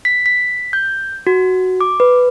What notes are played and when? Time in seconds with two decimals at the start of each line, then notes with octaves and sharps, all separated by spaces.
0.05 B6
0.26 B6
0.73 G6
1.27 F#4
1.81 D6
2.00 B4